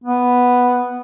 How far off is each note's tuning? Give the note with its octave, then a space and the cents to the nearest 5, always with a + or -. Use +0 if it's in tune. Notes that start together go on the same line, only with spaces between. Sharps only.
B3 +0